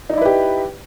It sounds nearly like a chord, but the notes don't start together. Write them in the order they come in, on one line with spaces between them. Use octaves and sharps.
D#4 D5 E4 B4 G4